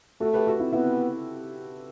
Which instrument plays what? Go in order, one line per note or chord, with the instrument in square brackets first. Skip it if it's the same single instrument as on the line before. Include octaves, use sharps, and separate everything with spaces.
[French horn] A3 [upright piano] F#4 A4
[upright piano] G4 B4
F#4 A4
C4 E4
[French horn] B3 [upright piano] C4 E4